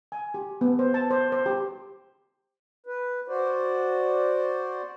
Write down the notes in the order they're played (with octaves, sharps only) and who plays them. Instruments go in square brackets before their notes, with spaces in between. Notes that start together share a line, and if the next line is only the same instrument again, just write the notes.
[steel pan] G#5
G4
B3
C5
A5
C5
C5
G4
[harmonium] B4
F#4 C5 D5